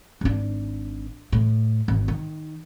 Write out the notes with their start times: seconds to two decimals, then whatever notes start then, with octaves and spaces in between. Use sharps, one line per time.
0.21 G#1 D4
1.32 A2
1.88 G#1
2.08 D#3